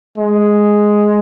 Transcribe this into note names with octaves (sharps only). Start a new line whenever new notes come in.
G#3